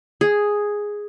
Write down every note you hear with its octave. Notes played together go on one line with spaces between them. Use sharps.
G#4